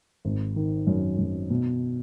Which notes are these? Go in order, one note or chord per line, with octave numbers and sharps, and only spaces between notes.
G#1
D#3
F#2
F#2
B2